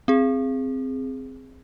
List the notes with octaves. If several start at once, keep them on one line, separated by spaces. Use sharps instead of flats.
C4 G#4